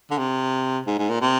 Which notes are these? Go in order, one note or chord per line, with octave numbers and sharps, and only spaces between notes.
D3
C3
G#2
G#2
A#2
C3